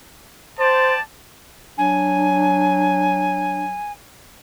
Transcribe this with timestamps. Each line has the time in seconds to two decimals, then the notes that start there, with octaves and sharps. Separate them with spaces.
0.59 C5 D5 G5 A5
1.78 F#3 D4 G#5